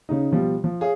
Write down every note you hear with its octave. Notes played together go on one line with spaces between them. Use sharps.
C#3 D#4
B2 F3 G3
F3
G#4 C#5 F5